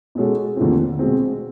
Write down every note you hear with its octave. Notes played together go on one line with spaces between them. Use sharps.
B2 G#3 C#4 F#4 A4
D#2 D3 F3 A3 C4
B2 G#3 C4